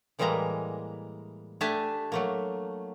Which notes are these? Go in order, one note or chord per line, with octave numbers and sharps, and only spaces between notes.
A2 E3 G3 G#3 A#3 A#5
A3 D4 G4 E5 G#5 A5
F#3 A3 A#3